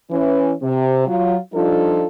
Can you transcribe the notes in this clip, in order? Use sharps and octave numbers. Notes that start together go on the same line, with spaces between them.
E3 C#4
C3
F#3 F4
F3 G3 D4 D#4 F4 A4